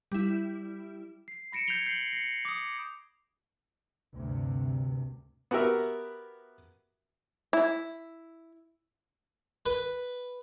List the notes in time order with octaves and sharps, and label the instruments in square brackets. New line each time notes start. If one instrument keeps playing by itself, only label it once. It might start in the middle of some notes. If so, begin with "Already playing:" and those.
[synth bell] G3 E4
[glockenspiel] C7
B5 A#6 C#7 D7 E7
G6 G#6 A#6 C7 F7 G7
G6 C7 F#7 G7
A#6 C7 C#7
D6 D#6
[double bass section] D2 G2 C3
[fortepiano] B3 F#4 G4 A#4 E5
[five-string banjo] E4
[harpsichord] B4